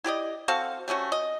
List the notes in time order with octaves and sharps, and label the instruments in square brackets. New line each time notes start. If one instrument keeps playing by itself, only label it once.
[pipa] E4 G4 D5 D#5
C4 F#4 A4 F5
G3 A3 C#4 F#4
D#5